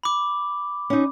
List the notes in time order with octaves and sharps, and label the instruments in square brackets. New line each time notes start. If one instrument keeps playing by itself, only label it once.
[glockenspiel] B5 D6
[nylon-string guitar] C#4 D#4